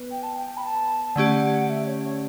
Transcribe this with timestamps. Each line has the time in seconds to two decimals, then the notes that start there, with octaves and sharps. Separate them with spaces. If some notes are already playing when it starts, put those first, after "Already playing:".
Already playing: B3 B4
0.11 G5
0.23 A5
0.35 G5
0.57 B5
0.64 A5
1.16 D3 A3 C#4 G4 D5 F#5
1.70 E5
1.86 C#5
2.04 C#5